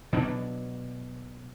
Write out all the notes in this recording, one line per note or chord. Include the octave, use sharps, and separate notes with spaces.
B2 F#3 D4